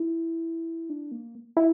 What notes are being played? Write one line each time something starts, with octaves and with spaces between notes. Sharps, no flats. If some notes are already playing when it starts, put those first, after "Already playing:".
Already playing: E4
D4
A#3
E4